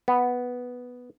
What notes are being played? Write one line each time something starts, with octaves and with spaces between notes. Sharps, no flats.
B3